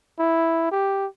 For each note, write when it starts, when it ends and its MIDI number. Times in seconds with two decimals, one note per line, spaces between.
0.19 0.68 64
0.71 1.07 67